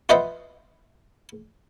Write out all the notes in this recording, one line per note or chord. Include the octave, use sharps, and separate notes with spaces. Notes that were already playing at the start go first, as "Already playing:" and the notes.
F4 B4 C5 D#5 E5 F#5